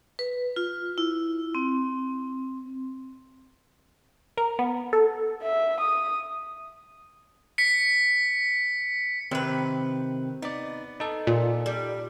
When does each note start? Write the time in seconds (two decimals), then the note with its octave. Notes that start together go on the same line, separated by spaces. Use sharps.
0.19 B4
0.56 F4
0.98 E4
1.55 C4
4.37 A#4
4.59 B3
4.93 A4
5.42 E5
5.80 D#6
7.58 B6 C#7
9.31 C3 D#3 C4 B4
10.42 B3 D#4 D5
11.00 D#4 A4
11.27 A#2
11.66 G3